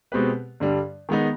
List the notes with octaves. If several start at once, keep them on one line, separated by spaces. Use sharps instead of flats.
B2 G#3 C4 G4 B4
G2 D3 G3
D#3 G#3 B3 D#4